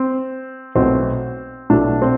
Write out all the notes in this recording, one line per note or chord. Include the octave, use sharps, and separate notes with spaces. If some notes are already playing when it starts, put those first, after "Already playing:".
Already playing: C4
B1 B2 A3 C4
B1 B2 A3 D4
C4